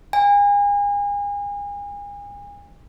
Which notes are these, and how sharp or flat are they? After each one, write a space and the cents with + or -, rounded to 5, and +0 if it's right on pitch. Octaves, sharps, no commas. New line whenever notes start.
G#5 -35